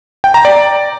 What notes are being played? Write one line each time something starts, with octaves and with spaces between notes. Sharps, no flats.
G5
A#5
D5